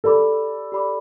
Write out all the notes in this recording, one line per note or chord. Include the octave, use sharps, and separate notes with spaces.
G4 A4 D5 B5 D6
G4 D5 B5 D6